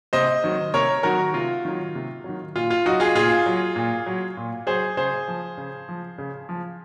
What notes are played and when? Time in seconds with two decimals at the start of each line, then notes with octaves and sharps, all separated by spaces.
0.13 C3 C5 D#5
0.44 D#3 F#3
0.74 C3 A#4 C#5
1.03 D#3 F#3 F#4 A#4
1.34 C3 F4
1.65 D#3 F#3
1.95 C3
2.24 D#3 F#3
2.55 A#2 F4
2.70 F4
2.85 F#3 D#4 F#4
3.00 F4 G#4
3.15 A#2 F4 G#4
3.46 F#3
3.76 A#2
4.06 F#3
4.37 A#2
4.67 F#3 G#4 C5
4.97 C#3 G#4 C5
5.28 F3
5.58 C#3
5.89 F3
6.18 C#3
6.49 F3